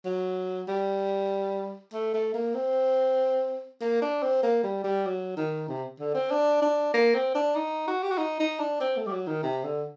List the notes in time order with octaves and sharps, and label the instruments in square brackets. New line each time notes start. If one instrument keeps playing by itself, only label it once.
[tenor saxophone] F#3
G3
A3
A3
A#3
C4
A#3
D4
C4
A#3
G3
G3
F#3
D#3
C3
D3
C4
D4
D4
A#3
C4
D4
D#4
F#4
G4
F#4
D#4
D#4
D4
C4
A3
G3
F#3
D#3
C3
D3